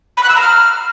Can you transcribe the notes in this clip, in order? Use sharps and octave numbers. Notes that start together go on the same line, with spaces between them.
B5
F#6
E6
A#5
F6